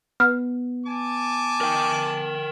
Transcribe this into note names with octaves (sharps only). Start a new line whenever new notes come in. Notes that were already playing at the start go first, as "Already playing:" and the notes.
B3 F6
G#5 A5 D6
A#4 G5